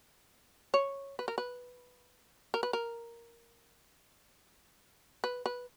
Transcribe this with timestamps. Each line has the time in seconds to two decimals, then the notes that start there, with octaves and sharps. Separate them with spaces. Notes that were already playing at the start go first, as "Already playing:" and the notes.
0.74 C#5
1.19 B4
1.28 A#4
1.38 B4
2.54 A#4
2.63 B4
2.73 A#4
5.24 B4
5.46 B4